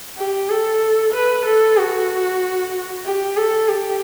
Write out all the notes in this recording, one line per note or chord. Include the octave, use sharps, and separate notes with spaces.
G4
A4
B4
A4
F#4
G4
A4
G4